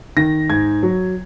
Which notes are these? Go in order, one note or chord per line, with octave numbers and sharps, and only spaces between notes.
D#3 A#6
G#2 G#6
F#3